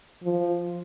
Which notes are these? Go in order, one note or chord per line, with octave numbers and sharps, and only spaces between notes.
F3